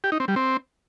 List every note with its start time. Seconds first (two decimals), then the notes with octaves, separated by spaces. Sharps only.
0.04 G4
0.12 D#4
0.20 C4
0.28 G3
0.36 C4